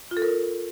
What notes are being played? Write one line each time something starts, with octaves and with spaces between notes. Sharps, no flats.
F4
A4
A#4